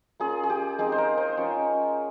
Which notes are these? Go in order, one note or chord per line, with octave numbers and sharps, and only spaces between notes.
A#3 C#4 F4 G#4
G#4
G4
G#3 C4 D#4 G#4
C5
A#4
C5
G#3 C#4 F4 C#5